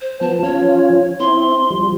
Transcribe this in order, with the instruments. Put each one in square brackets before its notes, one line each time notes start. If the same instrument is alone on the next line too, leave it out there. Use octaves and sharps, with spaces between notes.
[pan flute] C5
[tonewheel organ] F3 B3 [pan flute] A5
[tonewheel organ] F3 C#4 F4 [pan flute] C#5
[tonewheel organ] C4 E4 [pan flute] C6
[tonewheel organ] F3 G3